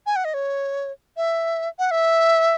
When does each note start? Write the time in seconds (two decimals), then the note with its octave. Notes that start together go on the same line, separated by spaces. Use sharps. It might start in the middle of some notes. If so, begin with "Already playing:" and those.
0.06 G#5
0.16 F#5
0.25 D#5
0.34 C#5
1.17 E5
1.79 F#5
1.91 E5